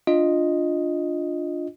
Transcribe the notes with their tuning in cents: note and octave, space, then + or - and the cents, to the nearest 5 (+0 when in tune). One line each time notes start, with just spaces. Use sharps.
D4 +0 F4 +0 D#5 +0